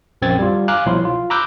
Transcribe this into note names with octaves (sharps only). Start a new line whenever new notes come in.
A#1 F#2 C4 G#6 A6
G3 F4
F5 G#5 A#5 D6 F6 F#6
C2 B2 F3 F#3 E4 C6
F4
A#5 B5 D6 E6 F#6 G6